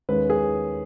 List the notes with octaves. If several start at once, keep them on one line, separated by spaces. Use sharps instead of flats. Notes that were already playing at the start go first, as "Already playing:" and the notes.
D#2 D#3 G#3 C#4 B4
G#4